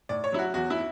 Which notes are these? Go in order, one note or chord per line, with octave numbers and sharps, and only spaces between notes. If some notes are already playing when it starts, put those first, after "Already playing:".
A2 D5
C#5
F#3 E4
F#4
E2 F#4
E4